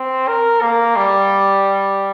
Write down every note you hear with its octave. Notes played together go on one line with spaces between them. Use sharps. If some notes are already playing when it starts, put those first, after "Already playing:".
Already playing: C4
A#4
A#3
G3